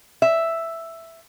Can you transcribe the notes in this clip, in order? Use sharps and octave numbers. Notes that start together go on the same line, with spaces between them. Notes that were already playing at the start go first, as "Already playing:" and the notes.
E5